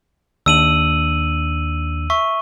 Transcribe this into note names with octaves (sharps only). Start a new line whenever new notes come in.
D#2 D4 E6 D#7 F#7
E5 C#6